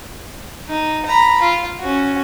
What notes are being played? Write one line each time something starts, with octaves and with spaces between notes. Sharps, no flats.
D#4
A#5 B5
F4
C#4 F#4